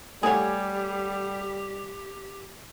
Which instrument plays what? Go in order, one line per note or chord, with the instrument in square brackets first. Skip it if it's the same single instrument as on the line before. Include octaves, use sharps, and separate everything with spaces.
[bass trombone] G3 [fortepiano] A3 F#5 [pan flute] G4 [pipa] G#4 C#5